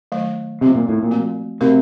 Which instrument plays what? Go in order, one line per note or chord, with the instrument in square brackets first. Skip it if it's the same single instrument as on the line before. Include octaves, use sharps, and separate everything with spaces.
[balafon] D#3 F#3 A3
[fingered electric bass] C3 [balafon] F#3 C4 F4
[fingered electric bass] A#2
A2
A#2
[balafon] F3 A3 C4 F#4
[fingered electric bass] C3 [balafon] A3 D#4 F#4 A#4